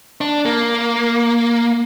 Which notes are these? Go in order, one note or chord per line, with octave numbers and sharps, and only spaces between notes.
D4
A#3